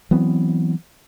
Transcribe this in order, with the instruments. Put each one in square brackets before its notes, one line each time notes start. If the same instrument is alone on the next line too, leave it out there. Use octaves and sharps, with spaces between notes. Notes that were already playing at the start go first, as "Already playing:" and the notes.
[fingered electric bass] E3 F#3 B3 C4